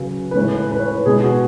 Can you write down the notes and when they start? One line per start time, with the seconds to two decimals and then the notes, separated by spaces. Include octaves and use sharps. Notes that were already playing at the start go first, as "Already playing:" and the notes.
Already playing: C#3 F#3 B4
0.31 B4
0.35 A2 G#3 C#5
0.54 B4
0.71 B4
0.80 C#5
0.89 B4
1.06 B2 G#3 G#4
1.23 F#4